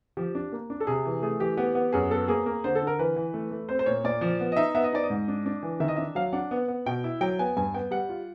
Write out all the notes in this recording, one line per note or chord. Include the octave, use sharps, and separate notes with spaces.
F3 G4
D4
A#3
D4
A4
C3 G#4
E3
A3 G#4
E3 G4
B3 G4
B3
F#2 G#4
B3 A4
A#3 G#4
A#3
D3 C5
A4
D3
A#4
E3 B4
E3
A3
A3
C4 C5
C5
A#2 C#5
A#2 D5
F3
B3
D#5
D#4 E5
B3 E5
D#5
D#4 D5
D#5
G#2
D4
D4
E3
D#3 E5
D#5
D4 E5
F#3 F5
D4 F#5
B3
B3
B2 G5
E4
F#3 G5
B3 G#5
G2 G#5
B3 G5
G3 F#5
F4